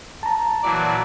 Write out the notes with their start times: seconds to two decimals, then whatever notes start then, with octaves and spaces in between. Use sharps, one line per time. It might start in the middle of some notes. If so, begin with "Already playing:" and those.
0.23 A5 A#5
0.63 A#2 E3 F#3 D5